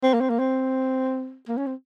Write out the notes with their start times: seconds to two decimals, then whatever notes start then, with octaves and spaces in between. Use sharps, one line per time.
0.03 C4
0.14 A#3
0.21 C4
0.30 A#3
0.39 C4
1.48 A#3
1.57 C#4
1.66 C4